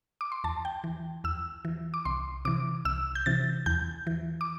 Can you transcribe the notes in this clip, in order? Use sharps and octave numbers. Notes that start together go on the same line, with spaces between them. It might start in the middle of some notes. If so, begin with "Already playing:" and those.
D6
C6
E2 A5
G5
E3
E2 E6
E3
D6
C2 C6
C3 E3 D6
C2 E6
G6
C3 E3 A6
E2 G6
E3
D6